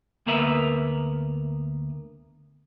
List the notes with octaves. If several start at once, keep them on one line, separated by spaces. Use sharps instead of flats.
D2 A#3 B3 A#4 B4 E5